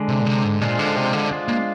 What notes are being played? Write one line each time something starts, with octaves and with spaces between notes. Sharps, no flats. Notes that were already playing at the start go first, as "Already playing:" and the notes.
Already playing: D3 G#3 D4
C3
A#2
C3
G#2
A#2 G#3 D4 F4 C5
D3
C3
D3
G#3 D4 F4 C5
A#3